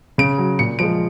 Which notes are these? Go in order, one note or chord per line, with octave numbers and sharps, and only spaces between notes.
C#3 D7
F#3
A#2 C#7
F3 G#3 D7